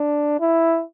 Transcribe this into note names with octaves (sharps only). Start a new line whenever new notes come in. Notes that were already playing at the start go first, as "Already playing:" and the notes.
Already playing: D4
E4